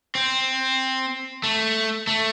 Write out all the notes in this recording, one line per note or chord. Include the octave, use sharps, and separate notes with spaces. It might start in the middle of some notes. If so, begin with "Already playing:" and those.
C4
A3
A3